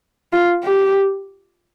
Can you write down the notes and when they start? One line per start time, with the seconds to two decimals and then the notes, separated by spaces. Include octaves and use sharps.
0.33 F4
0.64 G4